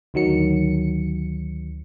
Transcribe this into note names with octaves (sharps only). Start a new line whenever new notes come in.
D2 D#3 F#3 C#7